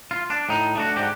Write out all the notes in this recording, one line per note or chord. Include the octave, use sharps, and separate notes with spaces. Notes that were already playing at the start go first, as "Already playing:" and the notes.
F4
D4
A2 D#4
A3 D4 F#4
G#2 D3 D4 F#4 G4